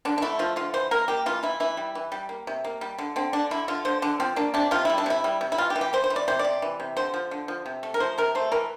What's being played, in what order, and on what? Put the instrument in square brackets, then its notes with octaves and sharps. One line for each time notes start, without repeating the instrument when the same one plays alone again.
[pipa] D3 D4
D4
A3 E4
F3 F4
D3 F4
E3 C5
A#3 A#4
A#3 G4
E3 F4
E3 E4
E3 E4
G3
E3
G3
A#3
C3
A#3
G3
D3
D3 C4
D3 D4
D3 E4
D3 F4
D3 C5
D3 D4
F3 C4
A#3 D4
C3 D4
C3 F4
G3 E4
D4
C3 E4
G3
C3
E4
E3 F4
G4
E3
G4
E3 C5
C5
E3
D5
C3 C5
D5
C3
E3
C3
D3 C5
F3
D3
F3
C3
A3
A#4
F3 C5
C3 A#4
A3 C5
E3 A#4